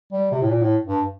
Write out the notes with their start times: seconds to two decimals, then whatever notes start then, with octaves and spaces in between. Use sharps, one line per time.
0.13 G3
0.32 C3
0.42 A2
0.50 A#2
0.63 A2
0.87 G2